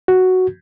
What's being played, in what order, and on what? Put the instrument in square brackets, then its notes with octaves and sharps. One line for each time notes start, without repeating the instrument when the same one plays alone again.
[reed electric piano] F#4